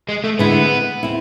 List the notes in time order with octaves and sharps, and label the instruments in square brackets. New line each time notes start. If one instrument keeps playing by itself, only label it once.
[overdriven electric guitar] G#3
A3
[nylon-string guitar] D3 G#3 C4 E4 [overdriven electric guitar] B3
[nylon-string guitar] C4 E4